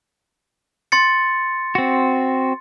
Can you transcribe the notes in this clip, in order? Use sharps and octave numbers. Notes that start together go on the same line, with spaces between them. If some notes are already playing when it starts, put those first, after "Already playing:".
C6 A6 C#7
C4 F#4